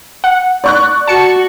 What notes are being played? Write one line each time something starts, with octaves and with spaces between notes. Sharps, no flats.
F#5
D5 C#6 F#6
F#4 A5 C#7